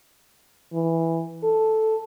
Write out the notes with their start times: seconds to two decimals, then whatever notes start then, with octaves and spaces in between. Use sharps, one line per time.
0.73 E3
1.44 A4